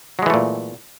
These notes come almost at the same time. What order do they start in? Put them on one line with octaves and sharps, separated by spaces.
F#3 G#3 E3 A3 A#2